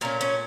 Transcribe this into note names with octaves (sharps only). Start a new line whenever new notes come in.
A#2 A3 C#4 A#4
C#4